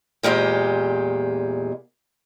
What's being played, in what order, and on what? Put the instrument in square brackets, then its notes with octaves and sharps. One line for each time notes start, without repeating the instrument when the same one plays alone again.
[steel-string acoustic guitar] E2 A#2 G#3 G4 C5